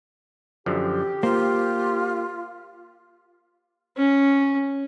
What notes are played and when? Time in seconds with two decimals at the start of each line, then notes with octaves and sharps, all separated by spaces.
0.66 F#2 D3 F3 G4
1.23 A#3 F4 C5
3.97 C#4